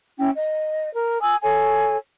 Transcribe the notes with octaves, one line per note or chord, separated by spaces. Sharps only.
C#4 E4 G5
D#5
A#4
G#5 D#6 E6
A4 C#5 G#5